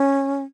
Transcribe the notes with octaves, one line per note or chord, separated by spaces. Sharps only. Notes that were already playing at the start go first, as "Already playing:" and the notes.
Already playing: C#4